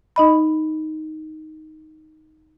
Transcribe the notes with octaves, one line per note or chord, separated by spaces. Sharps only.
D#4 D#5 B5